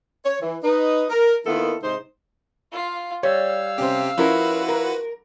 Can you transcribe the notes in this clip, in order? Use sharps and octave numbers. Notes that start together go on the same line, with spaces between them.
C#5
E3
D#4 B4
A#4
D#3 A#3 B3 E4 F4 A4
G#2 C3 D#4 C5
F4 F5
G3 C#5 F5 E6
C3 C#4 G4 C5
F3 C#4 E4 F#4 A#4 B4
A#4